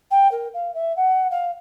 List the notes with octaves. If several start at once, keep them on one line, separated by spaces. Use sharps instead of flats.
G5
A#4
F5
E5
F#5
F5